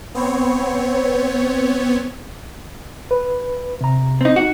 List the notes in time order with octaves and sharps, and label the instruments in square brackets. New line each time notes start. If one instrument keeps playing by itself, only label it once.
[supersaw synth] B3 C4 C#5
[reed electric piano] B4
C3 A#5
[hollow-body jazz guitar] C4 D#4
[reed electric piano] D#4 F#5 [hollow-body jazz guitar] F#4